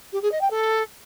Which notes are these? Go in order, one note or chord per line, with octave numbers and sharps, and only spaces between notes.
G4
G#4
D#5
G5
A4